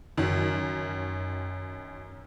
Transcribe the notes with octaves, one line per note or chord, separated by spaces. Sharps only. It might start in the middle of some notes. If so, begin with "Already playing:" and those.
F#2 D#3